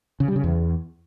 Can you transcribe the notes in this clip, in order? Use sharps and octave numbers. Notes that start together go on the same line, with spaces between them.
C#3
G3
C#3
E2